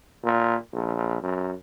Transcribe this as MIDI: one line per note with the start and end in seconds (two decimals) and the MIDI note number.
0.24 0.56 46
0.73 1.22 34
1.22 1.53 42